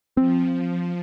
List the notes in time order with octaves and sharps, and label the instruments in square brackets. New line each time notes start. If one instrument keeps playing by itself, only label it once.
[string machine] F3 [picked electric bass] C4